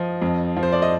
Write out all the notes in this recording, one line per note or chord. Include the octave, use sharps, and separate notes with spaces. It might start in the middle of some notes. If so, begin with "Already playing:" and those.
Already playing: F3 D#5
F2
F3
C5
D5
D#5